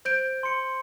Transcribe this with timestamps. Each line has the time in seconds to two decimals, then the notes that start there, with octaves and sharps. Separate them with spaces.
0.05 C5 G6 D7
0.43 C6 C#7